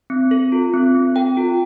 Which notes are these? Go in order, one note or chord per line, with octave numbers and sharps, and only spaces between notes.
C4
A4
F4
C4
C4
A4 G5
F4